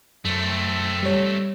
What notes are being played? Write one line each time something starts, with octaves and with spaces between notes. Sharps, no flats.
F#2 A3 C4
G3 C#5